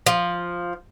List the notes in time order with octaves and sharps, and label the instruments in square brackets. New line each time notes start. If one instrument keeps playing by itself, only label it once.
[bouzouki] F3